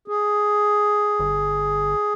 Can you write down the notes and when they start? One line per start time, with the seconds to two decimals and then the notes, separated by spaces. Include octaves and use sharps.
0.08 G#4
1.20 G1